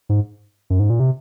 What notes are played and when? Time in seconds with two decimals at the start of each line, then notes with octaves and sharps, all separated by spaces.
0.09 G#2
0.70 F#2
0.80 G#2
0.90 A#2
1.00 C3